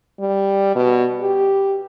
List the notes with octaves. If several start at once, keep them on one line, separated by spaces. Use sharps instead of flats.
G3
B2
G4